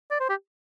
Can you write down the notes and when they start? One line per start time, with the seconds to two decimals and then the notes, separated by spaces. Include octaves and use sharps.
0.11 D5
0.20 C5
0.29 G4